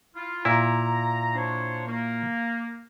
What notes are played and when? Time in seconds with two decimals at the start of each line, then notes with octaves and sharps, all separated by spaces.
0.16 E4 F4
0.45 A#2 E4 A#5
1.35 D4 C5 C#5
1.87 A#3